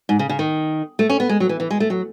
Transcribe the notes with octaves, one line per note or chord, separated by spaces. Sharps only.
G#2
C#3
C#3
D#3
A3
C#4
B3
G#3
F#3
E3
E3
G#3
A3
F#3